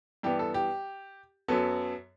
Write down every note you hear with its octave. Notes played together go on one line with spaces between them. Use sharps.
G2 E3 B3 G4
A4
G4
F#2 F#3 B3 A4